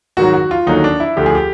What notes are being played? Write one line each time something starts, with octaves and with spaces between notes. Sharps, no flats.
G#2 D#3 F#3 F#4
F#4
F4
D#2 D3 F#3 D#4
D4
E4
D2 D3 F3 G4
G#4
G4